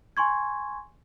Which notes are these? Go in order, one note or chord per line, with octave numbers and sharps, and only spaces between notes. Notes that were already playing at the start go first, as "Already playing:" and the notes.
G#5 C6 C#6 G#6